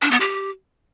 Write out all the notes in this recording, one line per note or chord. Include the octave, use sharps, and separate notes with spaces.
D4
B3
G4